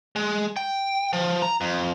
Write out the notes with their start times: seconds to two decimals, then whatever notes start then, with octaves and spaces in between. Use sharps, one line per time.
0.16 G#3
0.56 G5
1.13 F3
1.42 A#5
1.61 F2